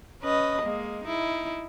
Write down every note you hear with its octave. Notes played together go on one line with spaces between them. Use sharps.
C#4 B4 D#5
G#3 A#3
D#4 E4